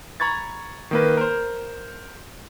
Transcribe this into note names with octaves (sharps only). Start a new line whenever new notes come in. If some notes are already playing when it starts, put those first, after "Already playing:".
A#5 B5 C#6 G#6 A6
D#3 A#3 B4
A#4 C5